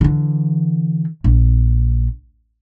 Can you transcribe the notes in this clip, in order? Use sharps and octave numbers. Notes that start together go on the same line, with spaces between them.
D3 E3
A#1